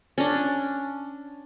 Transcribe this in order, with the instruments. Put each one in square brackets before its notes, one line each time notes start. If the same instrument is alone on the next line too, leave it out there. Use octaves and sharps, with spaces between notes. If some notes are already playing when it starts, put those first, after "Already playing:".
[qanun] C#4 D4